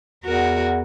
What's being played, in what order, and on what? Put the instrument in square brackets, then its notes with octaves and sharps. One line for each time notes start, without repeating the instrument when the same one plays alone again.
[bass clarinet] E2 [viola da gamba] F#4 A#4